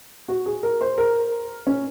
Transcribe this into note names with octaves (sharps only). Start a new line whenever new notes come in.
F#4
G#4
A#4
C5
A#4
C#4